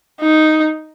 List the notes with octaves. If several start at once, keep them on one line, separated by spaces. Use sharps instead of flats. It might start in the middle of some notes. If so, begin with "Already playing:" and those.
D#4